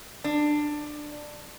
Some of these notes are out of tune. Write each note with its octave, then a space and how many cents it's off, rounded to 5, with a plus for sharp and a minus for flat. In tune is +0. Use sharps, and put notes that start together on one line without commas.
D4 +15